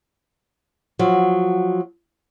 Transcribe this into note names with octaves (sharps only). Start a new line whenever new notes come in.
F3 F#3